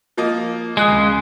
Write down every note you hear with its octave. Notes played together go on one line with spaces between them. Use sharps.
F3 A#3 D#5
G#3 D#6 F#6 C7
C#2 C#3